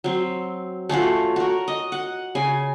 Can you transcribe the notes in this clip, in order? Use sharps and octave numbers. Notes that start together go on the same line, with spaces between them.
F#3 C4
A3 C#4 F4 F#4
F#4 A#4
D#5
F#5
C#3 G#5